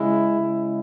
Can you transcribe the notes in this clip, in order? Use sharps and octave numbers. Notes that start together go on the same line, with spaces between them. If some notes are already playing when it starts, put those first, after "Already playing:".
Already playing: C#3 G#3 E4
C#3 G#3